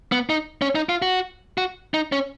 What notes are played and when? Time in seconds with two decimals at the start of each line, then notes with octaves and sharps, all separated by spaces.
0.12 B3
0.30 D#4
0.62 C#4
0.75 D#4
0.89 F4
1.02 F#4
1.58 F#4
1.94 D#4
2.12 C#4